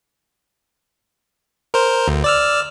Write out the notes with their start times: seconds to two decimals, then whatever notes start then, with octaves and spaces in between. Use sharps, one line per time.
1.74 A#4 C5
2.08 D2
2.24 D5 E6 F6